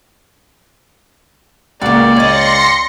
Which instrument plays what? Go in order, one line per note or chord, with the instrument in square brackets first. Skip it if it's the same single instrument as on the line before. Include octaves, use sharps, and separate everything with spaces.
[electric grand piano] C#2 [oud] A#3 F#4 [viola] D5
[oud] C#5 D#5 [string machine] C6 A#6 C#7